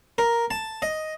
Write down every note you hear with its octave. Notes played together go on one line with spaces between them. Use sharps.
A#4
A5
D#5